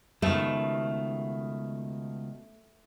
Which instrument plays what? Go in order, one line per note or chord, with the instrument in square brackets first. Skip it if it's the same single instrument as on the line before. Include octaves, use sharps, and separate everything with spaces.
[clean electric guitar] C#2 B2 D#3 [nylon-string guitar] A3